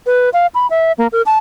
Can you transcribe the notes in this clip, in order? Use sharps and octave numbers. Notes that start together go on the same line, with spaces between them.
B4
F5
B5
E5
A#3
A#4
A5